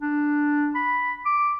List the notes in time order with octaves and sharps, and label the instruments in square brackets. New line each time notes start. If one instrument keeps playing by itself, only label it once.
[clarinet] D4
B5
D6